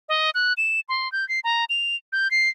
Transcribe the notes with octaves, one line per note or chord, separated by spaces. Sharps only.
D#5
F#6
E7
C6
G6
C7
A#5
F7
G6
C7